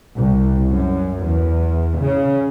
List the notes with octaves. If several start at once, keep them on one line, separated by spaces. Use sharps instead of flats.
C2
F#2
E2
C#3